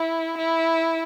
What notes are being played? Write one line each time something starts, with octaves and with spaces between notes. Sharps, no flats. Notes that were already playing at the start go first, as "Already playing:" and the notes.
Already playing: E4
E4